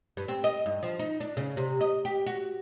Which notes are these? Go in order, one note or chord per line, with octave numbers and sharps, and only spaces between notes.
G2
C4
D#5
G2
F3
D#4
D4
C#3
C3
D#5
G4
F#4